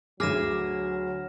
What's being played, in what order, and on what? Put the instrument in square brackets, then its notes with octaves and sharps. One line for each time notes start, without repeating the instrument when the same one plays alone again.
[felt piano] D2 D6 [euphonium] F#3 [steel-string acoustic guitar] G#4 [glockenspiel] F6 A#6 E7